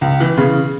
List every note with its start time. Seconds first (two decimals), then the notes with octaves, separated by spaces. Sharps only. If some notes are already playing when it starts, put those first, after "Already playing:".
0.01 C#2
0.20 E3
0.38 C#3